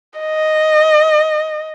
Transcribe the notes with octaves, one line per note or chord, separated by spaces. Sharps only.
D#5